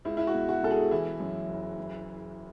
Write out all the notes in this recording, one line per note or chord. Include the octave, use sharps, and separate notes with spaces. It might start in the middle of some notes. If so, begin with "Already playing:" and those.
C#2 E4
E4
F#4
B2
F#4
B2 A4
G#4
E3 E4
F#2
F#1
E3